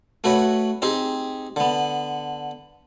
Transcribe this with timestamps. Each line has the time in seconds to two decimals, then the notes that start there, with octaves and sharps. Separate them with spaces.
0.24 A3 F#4 B4 C#5
0.82 C4 D#4 G4 G#4
1.56 D3 B3